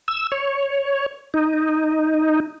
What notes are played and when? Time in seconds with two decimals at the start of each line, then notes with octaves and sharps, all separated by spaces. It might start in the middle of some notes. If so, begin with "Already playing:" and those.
0.08 E6
0.32 C#5
1.34 D#4